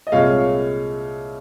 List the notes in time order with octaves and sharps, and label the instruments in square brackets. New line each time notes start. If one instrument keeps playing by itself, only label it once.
[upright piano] D#5
C2 A#2 G#3 C#5 F5